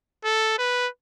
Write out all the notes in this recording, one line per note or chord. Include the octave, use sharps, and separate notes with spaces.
A4
B4